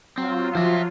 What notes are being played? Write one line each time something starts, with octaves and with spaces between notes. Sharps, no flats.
F#3 C4 F4
F3 C5 E5